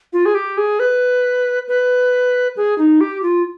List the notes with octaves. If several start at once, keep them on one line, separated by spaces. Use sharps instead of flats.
F4
G#4
G4
G#4
B4
B4
G#4
D#4
G4
F4